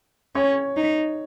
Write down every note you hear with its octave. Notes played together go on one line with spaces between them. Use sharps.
C#4 C#5
D#4